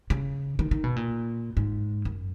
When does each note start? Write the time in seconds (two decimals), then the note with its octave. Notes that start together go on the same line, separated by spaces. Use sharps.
0.10 C#3
0.59 D#3
0.71 D#3
0.84 B2
0.96 A#2
1.57 G#2
2.05 F#2